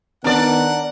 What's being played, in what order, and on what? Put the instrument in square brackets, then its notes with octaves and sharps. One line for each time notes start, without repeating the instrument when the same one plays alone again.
[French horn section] D#3 B3 [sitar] D4 D5 [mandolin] A#4 [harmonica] F#5